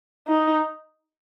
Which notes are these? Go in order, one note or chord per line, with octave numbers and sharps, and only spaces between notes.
D#4